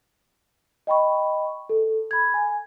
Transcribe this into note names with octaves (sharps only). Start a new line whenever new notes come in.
D#5 G5 B5 C#6
A4
B5 G#6
G#5